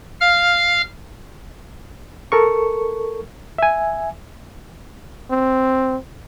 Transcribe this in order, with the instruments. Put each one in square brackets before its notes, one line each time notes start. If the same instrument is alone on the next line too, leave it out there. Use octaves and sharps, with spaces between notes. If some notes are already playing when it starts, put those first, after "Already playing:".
[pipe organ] F5 F6
[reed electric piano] A4 A#4 C#6
E5 G#5
[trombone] C4